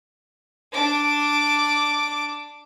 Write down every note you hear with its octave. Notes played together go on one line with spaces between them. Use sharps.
D4 D6